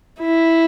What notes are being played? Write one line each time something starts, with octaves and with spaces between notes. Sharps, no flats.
E4